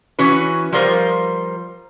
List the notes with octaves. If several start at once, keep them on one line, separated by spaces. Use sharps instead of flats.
E3 C#4 F#4 B4
F3 G3 F4 A#4 C5